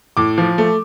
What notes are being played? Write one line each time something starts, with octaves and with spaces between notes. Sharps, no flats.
A2 D6
F3
A3